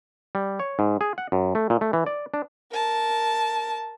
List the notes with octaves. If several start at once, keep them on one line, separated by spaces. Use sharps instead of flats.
G3
C#5
G#2
G#4
F#5
F#2
A3
A#2
A3
E3
D5
D4
A#4 A5